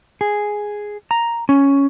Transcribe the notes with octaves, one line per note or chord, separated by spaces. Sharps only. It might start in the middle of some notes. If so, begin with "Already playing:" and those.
G#4
A#5
C#4